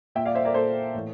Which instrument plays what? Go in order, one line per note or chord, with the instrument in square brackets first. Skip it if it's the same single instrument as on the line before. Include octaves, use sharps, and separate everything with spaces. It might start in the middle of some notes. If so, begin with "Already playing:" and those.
[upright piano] A#2 E5 G5
D5 F5
C5 E5
A#4 D5
A#2 A4 C5
A2 E3